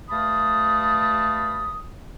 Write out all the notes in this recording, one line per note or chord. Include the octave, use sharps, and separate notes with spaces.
G2 A3 F5 A5 B5 D#6